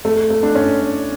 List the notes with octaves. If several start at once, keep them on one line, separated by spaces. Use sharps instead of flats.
A3
A3
D4
C#4